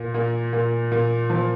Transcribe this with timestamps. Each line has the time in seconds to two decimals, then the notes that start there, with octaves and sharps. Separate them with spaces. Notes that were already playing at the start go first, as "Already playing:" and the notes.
Already playing: A#2
0.14 A#2
0.53 A#2
0.92 A#2
1.30 F3